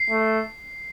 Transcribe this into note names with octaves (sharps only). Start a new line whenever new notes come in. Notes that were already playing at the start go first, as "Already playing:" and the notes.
Already playing: C7
A3